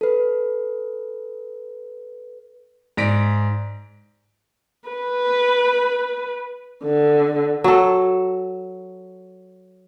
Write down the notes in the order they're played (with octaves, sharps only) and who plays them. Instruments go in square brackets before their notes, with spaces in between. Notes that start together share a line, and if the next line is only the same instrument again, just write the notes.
[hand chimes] A4 B4
[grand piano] G#2 D5 A#6 B6 D7
[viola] B4
D3
[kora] F#3 A4